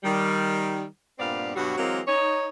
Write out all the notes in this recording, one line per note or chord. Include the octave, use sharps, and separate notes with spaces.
D#3 G3
G2 A#2 B3 C4 D5 F5
G2 B2 F#3 G3 F#4
E3 F#3 G#3 A#3 C4 A#4
D#4 C#5